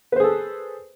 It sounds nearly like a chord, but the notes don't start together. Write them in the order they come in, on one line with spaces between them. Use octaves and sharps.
B4 C5 G#4 A4